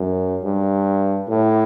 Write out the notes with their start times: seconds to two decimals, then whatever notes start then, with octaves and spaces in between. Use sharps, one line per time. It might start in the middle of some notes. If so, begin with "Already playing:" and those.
Already playing: F#2
0.43 G2
1.28 A2